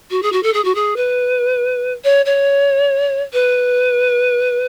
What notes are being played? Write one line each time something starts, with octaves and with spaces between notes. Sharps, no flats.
F#4
G#4
F#4
A4
G#4
F#4
G#4
B4
C#5
C#5
B4